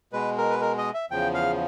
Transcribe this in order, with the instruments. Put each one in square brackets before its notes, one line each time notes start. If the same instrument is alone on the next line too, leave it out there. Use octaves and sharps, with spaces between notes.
[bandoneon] B2 G#3 B4
A#4
B4
A#4
D#5
E5
E2 C#3 F3 G5
F5